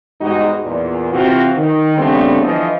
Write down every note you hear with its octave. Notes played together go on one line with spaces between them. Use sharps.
E2 G#2 G3 G#3 D#4 F#4
E2 A#2
C3 E3 C4 F4 F#4
D#3
C#3 G3 A3 B3 C4 D4
D3 E3 F3 F4 D#5